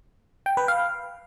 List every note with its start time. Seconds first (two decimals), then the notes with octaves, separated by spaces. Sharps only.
0.46 G5
0.57 B4
0.68 F5